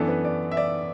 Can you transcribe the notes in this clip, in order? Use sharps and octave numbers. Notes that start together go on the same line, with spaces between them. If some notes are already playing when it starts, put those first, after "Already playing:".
Already playing: F#2 E3 B3 D4 A4
B4
D5
E5
D5